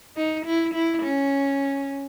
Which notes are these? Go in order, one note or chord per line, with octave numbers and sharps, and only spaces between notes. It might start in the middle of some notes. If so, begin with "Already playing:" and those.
D#4
E4
E4
C#4